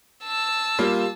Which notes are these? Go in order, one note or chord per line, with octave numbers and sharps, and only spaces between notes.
A5 E6
G3 A#3 F4